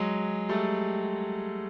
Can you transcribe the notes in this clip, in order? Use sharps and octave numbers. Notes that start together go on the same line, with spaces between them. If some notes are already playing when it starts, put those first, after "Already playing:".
Already playing: F#3 G#3
G3 A3